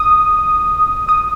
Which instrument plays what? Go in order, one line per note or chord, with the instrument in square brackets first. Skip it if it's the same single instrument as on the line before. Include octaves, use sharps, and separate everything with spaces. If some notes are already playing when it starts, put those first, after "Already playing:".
Already playing: [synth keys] D#6
D#6